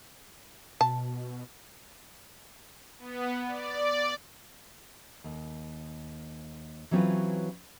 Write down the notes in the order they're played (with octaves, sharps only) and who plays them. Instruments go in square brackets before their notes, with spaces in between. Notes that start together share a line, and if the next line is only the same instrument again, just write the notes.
[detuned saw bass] B2 [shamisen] A5
[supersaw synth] B3
D5
[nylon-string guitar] D#2
E3 F#3 C4 C#4 F4 B4